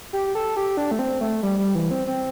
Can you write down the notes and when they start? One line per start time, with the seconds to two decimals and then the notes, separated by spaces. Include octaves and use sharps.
0.13 G4
0.35 A4
0.57 G4
0.77 D4
0.91 A3
0.99 C4
1.21 A3
1.43 G3
1.59 G3
1.75 E3
1.91 C4
2.07 C4